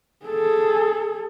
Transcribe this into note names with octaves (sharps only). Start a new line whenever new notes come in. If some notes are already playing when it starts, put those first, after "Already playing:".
G#4 A4